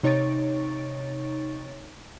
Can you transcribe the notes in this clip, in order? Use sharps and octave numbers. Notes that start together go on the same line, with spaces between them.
C3 D#4 C#5 C#6 A6 D7